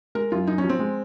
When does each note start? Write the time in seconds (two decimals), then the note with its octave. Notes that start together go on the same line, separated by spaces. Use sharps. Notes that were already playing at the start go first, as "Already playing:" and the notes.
0.15 G#3 A#4
0.32 F#2 F4
0.47 F#2 D#4
0.58 C#4
0.64 F3
0.69 C4
0.79 G#3